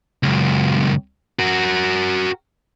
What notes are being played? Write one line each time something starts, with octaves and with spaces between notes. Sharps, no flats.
C#2 F#2
F#4 A#4